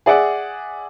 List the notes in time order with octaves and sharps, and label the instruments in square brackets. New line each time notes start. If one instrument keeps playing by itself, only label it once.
[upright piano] G#4 D5 E5 F#5